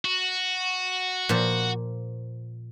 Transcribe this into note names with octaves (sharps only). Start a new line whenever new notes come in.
F#4
A#2 F3